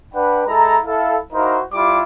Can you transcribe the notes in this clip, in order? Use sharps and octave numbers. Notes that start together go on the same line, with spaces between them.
D4 B4 F#5 G5 B5
G#3 E4 A4 A#5
E4 A4 F5
D#4 E4 F#4 A#4 C5 F5
G3 E4 F4 G4 B5 D6